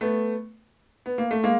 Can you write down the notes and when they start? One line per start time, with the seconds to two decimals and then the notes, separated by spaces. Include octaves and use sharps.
0.01 A3 B3
1.06 B3
1.18 A#3
1.31 A3
1.43 G#3 A#3